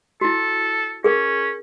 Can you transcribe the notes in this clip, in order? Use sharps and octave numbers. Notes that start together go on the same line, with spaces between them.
E4 F#4 A4
C#4 G#4 A#4